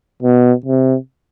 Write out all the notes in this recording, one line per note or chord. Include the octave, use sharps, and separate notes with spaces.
B2
C3